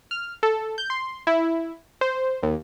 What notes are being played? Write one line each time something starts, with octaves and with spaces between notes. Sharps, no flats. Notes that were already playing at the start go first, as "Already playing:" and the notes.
F6
A4
G6
C6
E4
C5
D#2